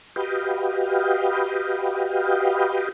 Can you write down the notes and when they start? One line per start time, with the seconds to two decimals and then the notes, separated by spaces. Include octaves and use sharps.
0.16 F#4 G4 B4 D#5 F5 G5